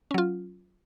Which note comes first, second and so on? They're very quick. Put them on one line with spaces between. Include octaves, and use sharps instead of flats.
C#4 F#3 F4